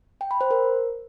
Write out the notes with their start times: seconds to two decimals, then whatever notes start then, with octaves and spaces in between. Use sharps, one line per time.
0.21 G5
0.31 B5
0.41 C5
0.51 A#4